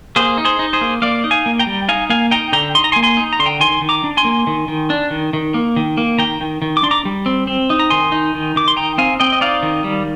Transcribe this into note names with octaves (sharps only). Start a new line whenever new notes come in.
A#3 G#4 C5
D#4
G#4 C5
D#4
G#4 C5
A#3
A#3 D5 F5
D#4
F5 G#5
A#3
G5 A#5
G3
D#4 F5 G#5
A#3 F5 G#5
D#4 G5 A#5
D3 G5 A#5
D#4 C6
A#5
G#5 C6
A#3
G#5 C6
D#4
A#5
D3 C6
G5 A#5
D#3 G#5 C6
D#3
A#5 D6
D4
G#5 C6
A#3
D#3
D#3
D4
D#3
D#3
A#3
D#3
A#3
D#3 G5 A#5
D#3
D#3
D6
D4 C6
A#5 D6
G3
C4
C4
D#4
A#5
D#3 G#5 C6
D#4
D#3
D#3 D6
C6
D#4 G5 A#5
C4 F5 G#5
C4 D#5 G5
D#5
D#4 D5 F5
D#3
G3